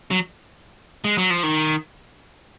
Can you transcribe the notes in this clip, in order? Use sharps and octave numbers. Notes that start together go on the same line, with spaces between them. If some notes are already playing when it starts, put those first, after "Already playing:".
F#3
G#3
F#3
F3
D#3